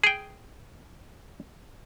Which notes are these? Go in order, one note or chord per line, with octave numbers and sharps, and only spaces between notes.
G#4 G5